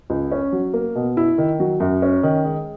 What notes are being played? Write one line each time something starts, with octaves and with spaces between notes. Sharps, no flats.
C#2
C#4
F#3
A#3
B2
E4
D#3
F#3
F#2
C#4
D#3
G#3